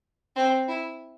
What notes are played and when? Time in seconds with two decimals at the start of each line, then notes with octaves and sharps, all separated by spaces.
0.36 C4
0.68 E4